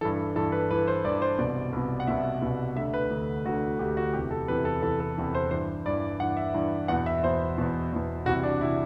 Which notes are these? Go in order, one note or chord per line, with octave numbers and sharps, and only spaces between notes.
G2 E3 A4
G2 E3 A4
B4
G2 E3 B4
C5
G2 E3 D5
C5
C2 B2 D5
C2 B2
F#5
C2 B2 E5
C2 B2
D2 D3 E5
B4
D2 D3
D2 D3 F#4
D2 D3 G4
F#4
E2 C3 E3 G4
A4
E2 C3 E3 B4
A4
E2 C3 E3 A4
A4
E2 C3 E3
C5
G2 E3 C5
G2 E3 D5
G2 E3 F#5
E5
G2 E3
E2 B2 F#5
E5
E2 B2 C5
E2 B2
E2 B2
C2 C3 E3 F#4
D4
C3 E3 E4